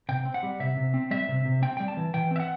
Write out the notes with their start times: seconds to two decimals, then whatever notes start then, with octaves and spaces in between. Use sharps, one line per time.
0.09 C3 G5
0.25 C4
0.34 F#5
0.43 G3
0.60 C3 E5
0.77 C3
0.94 C4
1.11 G3 E5
1.29 C3
1.45 C3
1.62 C4 G5
1.77 G3 G5
1.88 A5
1.97 E3
2.14 E3 G5
2.31 C4 E5
2.40 F#5